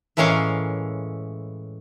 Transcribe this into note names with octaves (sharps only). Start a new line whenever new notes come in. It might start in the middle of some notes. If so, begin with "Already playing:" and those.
A2 E3 G#3 C#4 A#4 F5